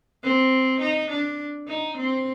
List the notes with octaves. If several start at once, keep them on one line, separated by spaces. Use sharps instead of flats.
C4
D#4
D4
D#4
C4